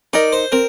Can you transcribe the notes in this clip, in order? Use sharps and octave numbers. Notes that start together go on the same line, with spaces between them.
D#4 A#4 D5 D#5
C5
C4 A#4